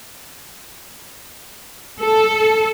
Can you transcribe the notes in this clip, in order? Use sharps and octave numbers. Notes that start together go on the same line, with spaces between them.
A4